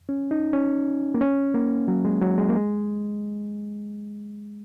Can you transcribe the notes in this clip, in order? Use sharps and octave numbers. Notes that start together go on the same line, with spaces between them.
C#4
D#4
C#4
A#3
C#4
A#3
F#3
G#3
F#3
G#3
A#3
G#3